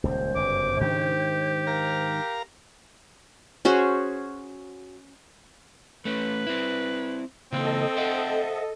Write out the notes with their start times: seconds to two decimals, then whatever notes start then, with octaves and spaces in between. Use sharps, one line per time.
0.04 D#1 C#2 C5
0.36 G1 F#2 C#3 D6
0.81 G#2 D#3 D4 G4
1.67 A#4 F5 A#5
3.65 C#4 F#4 G#4 C5
6.05 A3 C#4 B4
6.47 C4 E4
7.52 C#3 E3 A#3 C4 A4 D#5
7.97 C5 E5 F#5